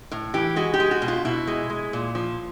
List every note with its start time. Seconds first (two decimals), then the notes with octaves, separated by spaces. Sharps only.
0.11 A2
0.34 E3 G4
0.56 G#3 F#4
0.74 G4
0.80 G#3
0.91 F#4
1.02 B2
1.08 F4
1.25 B2 E4
1.47 G#3
1.70 G#3
1.93 A#2
2.15 F3